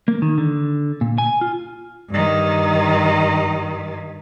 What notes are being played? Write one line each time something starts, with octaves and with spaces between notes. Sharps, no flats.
A#3
D#3
D3
A#2
G#5
F4
G2 D#3